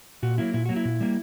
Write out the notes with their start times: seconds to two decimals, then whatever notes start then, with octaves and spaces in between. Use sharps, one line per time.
0.23 A#2 F#4
0.38 F#3 A#3 E4
0.54 A#2 E4
0.66 F#3 A#3 F#4
0.76 E4
0.85 A#2
1.01 G3 A#3